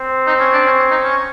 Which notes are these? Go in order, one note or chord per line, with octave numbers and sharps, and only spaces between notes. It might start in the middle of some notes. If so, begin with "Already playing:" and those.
Already playing: C4
D#4
C#4
D4
C#4
C#4
D#4
C#4